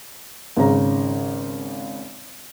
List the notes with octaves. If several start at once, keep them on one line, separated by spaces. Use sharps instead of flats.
G#1 C#3 A#5